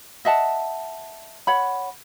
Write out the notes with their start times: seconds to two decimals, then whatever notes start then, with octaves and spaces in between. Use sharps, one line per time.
0.25 D#5 E5 F#5 A5
1.47 C#5 F#5 B5